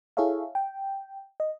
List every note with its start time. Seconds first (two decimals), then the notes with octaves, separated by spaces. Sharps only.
0.17 E4 G#4 A4 C#5 E5 F5
0.55 G5
1.40 D#5